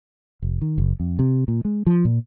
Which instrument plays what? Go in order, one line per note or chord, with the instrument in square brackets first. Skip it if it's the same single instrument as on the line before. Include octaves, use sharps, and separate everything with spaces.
[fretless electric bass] F1
D#3
F#1
F2
C3
A#2
G#3
F3
A#2